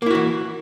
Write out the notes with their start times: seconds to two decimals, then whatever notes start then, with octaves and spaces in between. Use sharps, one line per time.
0.02 A#3
0.06 E4
0.11 F#4
0.15 E3